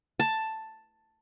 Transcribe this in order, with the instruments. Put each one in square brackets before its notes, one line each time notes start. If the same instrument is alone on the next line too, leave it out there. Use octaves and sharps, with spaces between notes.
[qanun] A5